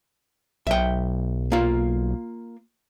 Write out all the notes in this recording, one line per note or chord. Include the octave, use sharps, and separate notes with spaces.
B1 E5 G5
A#3 F4